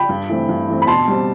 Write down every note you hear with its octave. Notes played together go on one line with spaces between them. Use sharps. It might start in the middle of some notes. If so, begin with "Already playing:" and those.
Already playing: G5 B5
G2
E3 A3 C4
G2
E3 A3 C4
B5
B2 A5 C6
G3 C4